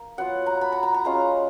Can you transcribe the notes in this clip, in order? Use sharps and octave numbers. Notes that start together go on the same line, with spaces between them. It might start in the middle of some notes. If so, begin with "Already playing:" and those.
Already playing: A#3
F#3 B3 F4 F#5
A#5
B5
A#5
A#5
A#5
G#3 C#4 F4 A#5